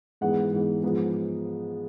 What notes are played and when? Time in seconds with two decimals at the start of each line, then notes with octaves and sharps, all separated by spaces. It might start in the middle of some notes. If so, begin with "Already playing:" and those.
0.21 G#2 E3 G#3 B3 F#5
0.52 G#2 E3 G#3 B3
0.83 G#2 F3 G#3 B3